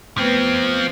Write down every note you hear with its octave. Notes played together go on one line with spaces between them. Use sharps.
F3 A3 B3 C4 B4